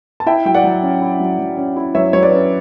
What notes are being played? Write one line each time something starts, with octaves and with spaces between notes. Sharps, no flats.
A5
E4 E5 G5
F#3 G5
D5 F#5
F#3
C#4
E4
F#3
F#3
C#4
E4
F#3 C#5 E5
F#3 C#5
B4 D5
C#4